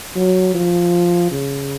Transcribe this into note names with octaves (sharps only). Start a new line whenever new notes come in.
F#3
F3
C#3